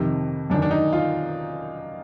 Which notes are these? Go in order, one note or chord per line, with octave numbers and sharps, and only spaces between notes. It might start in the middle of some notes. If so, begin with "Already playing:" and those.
Already playing: F2 C3 D#3
F#2 D#3 D4
D4
D#4
F4